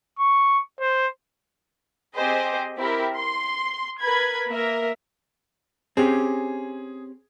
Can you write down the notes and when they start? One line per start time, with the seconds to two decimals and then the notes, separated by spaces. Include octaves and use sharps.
0.19 C#6
0.81 C5
2.15 C4 G4 G#4 C5 D#5
2.76 C4 E4 G4 A#4
3.16 C6
4.01 A#4 B4 B5 G#6
4.48 A#3 A#4 E5
5.97 C4 C#4 G4 G#4